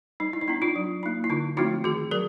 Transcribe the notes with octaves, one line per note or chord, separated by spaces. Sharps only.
G3 D#4
E4
D#4
B3 D4 E4
D#4 F4
F#3
A#3 D#4
E4
D3 D#4 F4
F3 A3 C4 D#4 E4 F#4
D#3 F#4 G#4
F#3 G#4 A#4